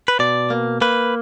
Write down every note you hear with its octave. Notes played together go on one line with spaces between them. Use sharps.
B4
B2 D5
A#3
A#3 B4